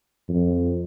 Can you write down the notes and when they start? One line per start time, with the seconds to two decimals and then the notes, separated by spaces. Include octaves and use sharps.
0.29 F2